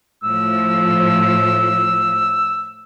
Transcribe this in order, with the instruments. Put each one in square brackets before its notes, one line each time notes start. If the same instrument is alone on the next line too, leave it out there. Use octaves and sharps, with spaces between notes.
[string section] A2 F3 [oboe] E6